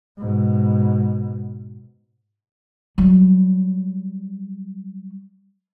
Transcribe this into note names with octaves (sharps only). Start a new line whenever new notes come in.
G#2 B2
F#3 G3